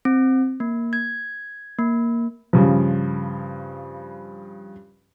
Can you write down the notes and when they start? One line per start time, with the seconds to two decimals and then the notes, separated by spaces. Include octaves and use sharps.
0.05 C4
0.60 A#3
0.93 G#6
1.79 A#3
2.53 G2 C#3 F3